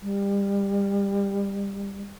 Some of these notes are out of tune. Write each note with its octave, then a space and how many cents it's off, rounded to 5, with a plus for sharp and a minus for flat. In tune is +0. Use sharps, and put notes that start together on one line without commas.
G3 +25